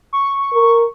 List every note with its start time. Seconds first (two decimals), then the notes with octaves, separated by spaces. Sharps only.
0.13 C#6
0.53 A#4